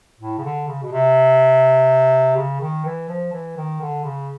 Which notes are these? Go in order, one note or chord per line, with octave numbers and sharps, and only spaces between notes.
A2
C#3
D3
C#3
B2
C3
C#3
D#3
E3
F3
E3
D#3
D3
C#3